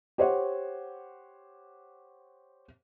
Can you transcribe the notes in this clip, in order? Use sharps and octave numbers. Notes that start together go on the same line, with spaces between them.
G4 C5 C#5 F#5